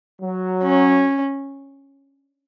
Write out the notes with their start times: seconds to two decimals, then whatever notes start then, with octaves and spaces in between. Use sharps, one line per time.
0.22 F#3
0.63 C#4